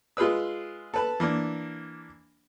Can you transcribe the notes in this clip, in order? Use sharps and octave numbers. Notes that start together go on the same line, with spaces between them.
G#3 F4 G#4 B4 E6
A4 B4 A5
E3 A#3 D4